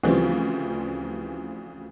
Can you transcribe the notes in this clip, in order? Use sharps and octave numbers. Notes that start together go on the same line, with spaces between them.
D2 C#3 E3 F3 G3 C4